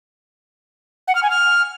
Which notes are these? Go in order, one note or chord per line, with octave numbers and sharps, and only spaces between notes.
F#5
F6
G#5
F6